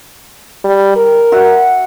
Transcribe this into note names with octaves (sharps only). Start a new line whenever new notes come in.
G3
A#4
F#4 E5 F#5